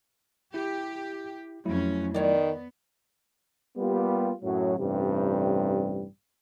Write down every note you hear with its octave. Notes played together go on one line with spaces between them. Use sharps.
E4 G4
F2 F#3 A3 C#4 E4
D#3 B3 C#5 D5
G3 A#3 B3 F4 G4
F#2 A2 F#3
A1 G2 C3 G3